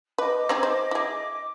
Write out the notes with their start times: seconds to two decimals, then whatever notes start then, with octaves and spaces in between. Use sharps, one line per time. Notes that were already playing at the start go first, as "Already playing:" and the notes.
0.18 B4 D#5 D6
0.49 C4 D#4 G#4
0.63 C5
0.91 E4 G#4